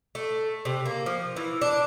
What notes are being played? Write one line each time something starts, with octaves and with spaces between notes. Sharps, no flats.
A3
C3
A#3
F3
E3
D4